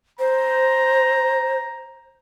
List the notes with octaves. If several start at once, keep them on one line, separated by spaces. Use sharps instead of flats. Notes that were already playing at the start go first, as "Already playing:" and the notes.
C5 A#5